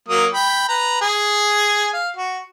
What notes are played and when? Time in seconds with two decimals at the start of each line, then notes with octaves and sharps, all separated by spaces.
0.08 F#3 A#3 D#6
0.33 G5 B5
0.69 B4 A#5
1.01 G#4 G#5
1.93 F5
2.17 F#4